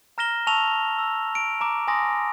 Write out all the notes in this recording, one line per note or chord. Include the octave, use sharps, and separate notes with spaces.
A#5 F6 A#6 E7 G7
A5 C#6 E6 F7 G7
E6
D7
A5 A#5 D6 D7
G#5 C6 D#6 A#6